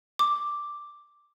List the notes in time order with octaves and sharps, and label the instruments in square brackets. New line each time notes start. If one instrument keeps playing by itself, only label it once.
[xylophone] D6